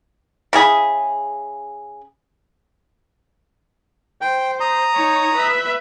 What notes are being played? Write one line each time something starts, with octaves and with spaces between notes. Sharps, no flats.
C#3 E4 G#4 B5
C5 G5
A#5 D#6
D#4 C#5
B4 E5